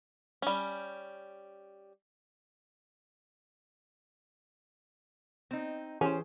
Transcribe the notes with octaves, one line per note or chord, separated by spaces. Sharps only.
G3 C#4
C4 D#4
E3 C#4 G4 G#4 C5